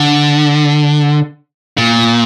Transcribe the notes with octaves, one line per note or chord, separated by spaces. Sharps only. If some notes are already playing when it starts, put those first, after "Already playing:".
Already playing: D3
A#2